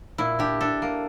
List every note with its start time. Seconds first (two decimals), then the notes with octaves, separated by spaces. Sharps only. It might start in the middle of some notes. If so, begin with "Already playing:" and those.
0.18 A#2 E4
0.39 D4 G4
0.61 D4 A4
0.82 A#3